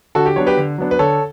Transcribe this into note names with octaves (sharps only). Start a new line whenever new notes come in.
D3 F#4 A4
G4
F#3 B3 D4 C#5
G4 B4
D3
F#3 B3 D4
B4
D3 A4 C#5